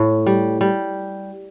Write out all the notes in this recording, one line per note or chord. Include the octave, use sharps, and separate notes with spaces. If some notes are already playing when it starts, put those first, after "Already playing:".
Already playing: A2
G3
G3